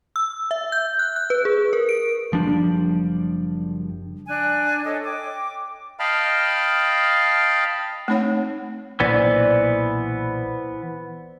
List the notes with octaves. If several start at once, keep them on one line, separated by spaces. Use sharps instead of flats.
E6
E5
G6
F#6
F#6
B4
G#4
A#4
D7
F#1 F3 G3 D4
D4 G#5 F#6
A4 C#5 D#5
G5 D6
D#5 F5 G5 A5 B5 F6
A3 C4 D#4 C#5 F#5
B1 A#2 E3 B3 C5 D5 F#5